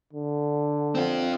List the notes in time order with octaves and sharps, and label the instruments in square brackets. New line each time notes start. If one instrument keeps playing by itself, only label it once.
[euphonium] D3
[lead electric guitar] C4 F4